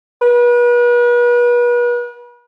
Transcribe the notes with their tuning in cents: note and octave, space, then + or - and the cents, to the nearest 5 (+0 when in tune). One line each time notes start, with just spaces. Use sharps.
B4 -35